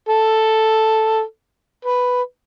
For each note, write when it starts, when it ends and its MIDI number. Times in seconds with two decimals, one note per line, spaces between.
0.09 1.21 69
1.85 2.22 71